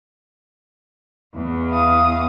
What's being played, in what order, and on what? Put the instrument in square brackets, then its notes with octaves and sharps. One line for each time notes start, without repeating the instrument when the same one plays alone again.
[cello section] E2
[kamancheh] F5 D#6